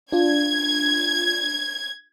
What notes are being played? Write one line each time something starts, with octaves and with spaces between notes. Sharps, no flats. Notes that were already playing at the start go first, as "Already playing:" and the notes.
D4 F4 G#6